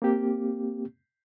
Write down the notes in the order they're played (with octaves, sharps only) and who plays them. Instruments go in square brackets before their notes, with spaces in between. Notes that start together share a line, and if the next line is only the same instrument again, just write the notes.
[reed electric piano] A#3 C4 G4